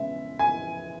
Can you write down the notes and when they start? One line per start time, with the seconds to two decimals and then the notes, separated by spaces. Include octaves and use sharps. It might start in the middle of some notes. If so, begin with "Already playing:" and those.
Already playing: C#3 G#3 B3 E5
0.39 G#5